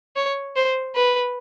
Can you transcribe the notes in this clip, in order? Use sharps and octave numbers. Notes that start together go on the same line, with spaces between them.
C#5
C5
B4